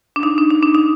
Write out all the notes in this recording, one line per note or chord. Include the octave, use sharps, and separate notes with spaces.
D4
D#4
D4
D#4
D4
D#4